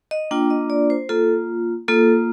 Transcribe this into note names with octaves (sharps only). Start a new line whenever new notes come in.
D#5
A#3 D4 F4 G5
D#5
D5
C5
A#3 F4 A4
A#3 F4 A4